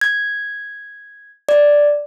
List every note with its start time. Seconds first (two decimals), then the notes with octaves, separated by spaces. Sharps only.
0.01 G#6
1.49 D5